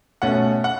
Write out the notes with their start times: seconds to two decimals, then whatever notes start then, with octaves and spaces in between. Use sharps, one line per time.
0.22 B2 A3 C#4 F#5
0.64 F#5